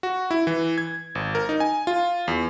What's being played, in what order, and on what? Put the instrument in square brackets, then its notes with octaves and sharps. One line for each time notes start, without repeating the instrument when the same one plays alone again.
[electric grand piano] F#4
E4
E3
G#6
G#1
A#4
D#4
G#5
F4
E2